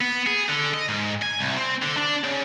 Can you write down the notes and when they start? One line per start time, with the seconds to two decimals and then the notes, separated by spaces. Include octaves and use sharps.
0.01 B3
0.26 G#4
0.49 D3
0.74 D#5
0.89 G#2
1.22 G#5
1.39 C2
1.57 C4
1.82 D3
1.97 D4
2.24 C#3